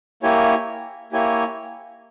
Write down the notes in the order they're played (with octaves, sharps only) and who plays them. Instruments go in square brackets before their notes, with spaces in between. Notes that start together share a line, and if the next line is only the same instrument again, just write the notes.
[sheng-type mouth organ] A#3 E4 G4 C#5 G#5
A#3 E4 G4 C#5 G#5